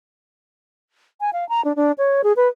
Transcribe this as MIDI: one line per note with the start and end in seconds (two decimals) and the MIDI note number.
1.20 1.30 80
1.33 1.47 77
1.49 1.63 82
1.64 1.72 62
1.76 1.92 62
1.98 2.22 73
2.24 2.33 68
2.36 2.48 71